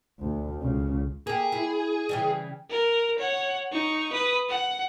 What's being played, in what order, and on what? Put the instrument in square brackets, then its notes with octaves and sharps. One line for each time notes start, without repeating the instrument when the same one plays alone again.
[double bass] D2
C#2 C#3
[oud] A#3 G4 [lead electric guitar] G#4
[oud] E4
C#3 E3 G3
[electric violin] A#4
C#5 F#5
D#4 C#6
B4 D#6
F#5